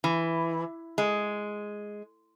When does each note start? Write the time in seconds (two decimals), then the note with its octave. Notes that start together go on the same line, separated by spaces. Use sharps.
0.04 E3
0.98 G#3